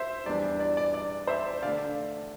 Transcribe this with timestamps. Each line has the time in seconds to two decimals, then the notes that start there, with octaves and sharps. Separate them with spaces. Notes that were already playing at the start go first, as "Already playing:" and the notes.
Already playing: C5 E5
0.26 E2 E3 G3 D4 D5
0.60 D5
0.77 D5
0.94 D5
1.27 C5 E5
1.63 D3 A3 D5 F5